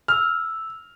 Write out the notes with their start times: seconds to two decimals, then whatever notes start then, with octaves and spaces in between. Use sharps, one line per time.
0.08 E6 F6